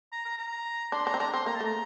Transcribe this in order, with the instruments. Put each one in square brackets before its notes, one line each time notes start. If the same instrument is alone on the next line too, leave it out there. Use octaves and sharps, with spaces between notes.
[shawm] A#5
A#5
A#5
[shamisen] D4 [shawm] C6
[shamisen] D4 [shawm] A#5
[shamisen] C4
[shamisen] D4 [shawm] A#5
[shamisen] C4 [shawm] C6
[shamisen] A#3 [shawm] A#5
[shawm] A5
[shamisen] A3 [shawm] A#5